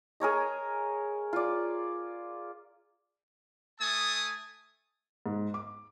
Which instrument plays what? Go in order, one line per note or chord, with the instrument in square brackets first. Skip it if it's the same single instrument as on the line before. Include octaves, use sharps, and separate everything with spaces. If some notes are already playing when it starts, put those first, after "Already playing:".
[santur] G#4 A#4 C#5 D#5
F4 D5
[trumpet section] A3 G#5 A5 D#6
[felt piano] G#2
D6